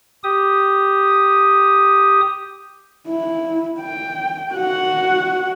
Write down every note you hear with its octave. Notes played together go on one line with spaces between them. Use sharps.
G4 D#6
E4
G5
F#4 F#5